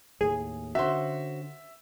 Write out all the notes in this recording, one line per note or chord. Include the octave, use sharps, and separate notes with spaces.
D#2 A2 G#4
D3 C#4 F#4 C5 E5